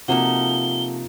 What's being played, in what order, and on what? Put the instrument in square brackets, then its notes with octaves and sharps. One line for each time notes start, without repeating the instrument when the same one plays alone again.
[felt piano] C3 F#4 [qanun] F3 A#3 D#4 [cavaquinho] A4 F#5 [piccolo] G7